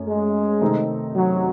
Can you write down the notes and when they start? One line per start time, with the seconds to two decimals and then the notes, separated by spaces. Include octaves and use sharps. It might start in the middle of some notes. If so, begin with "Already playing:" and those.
Already playing: F#2 A3 C#4
0.08 G#3
0.61 C3 D#3 A3 C4 D#4
1.16 F#3